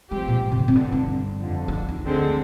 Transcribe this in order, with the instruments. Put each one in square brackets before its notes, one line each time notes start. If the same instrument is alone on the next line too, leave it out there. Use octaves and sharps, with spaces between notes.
[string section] G2 F3 C4 G4 [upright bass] G#3
[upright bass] A#2
C3
D3
C4
[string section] G1 G2 D3 [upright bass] D4
[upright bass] D#4
[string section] F2 D3 F3
[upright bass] D#4
D4
D#4
[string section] D2 D3 G#3 C4